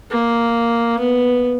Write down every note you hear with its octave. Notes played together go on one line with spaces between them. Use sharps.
A#3
B3